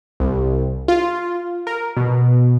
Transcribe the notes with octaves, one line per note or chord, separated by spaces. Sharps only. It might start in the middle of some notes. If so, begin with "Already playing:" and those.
C2
F4
A#4
B2